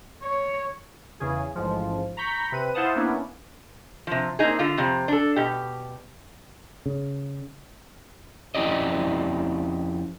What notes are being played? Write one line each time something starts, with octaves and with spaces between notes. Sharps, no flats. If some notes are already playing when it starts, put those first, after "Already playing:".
C#5
E2 C#3 G#4
A1 G#2 F3
A#5 B5 C#6 G6 B6
C3 B4 D#7
E4 C5 F5 F#5 A5 D#6
A#3 B3 C#4 D4 E4
C3 F3
A#3 C4 D4 D#4 G#4
D3 F4
F2 C3
D4 A4
B2 G4
C#3
F2 C#4 E4 G4 D5 D#5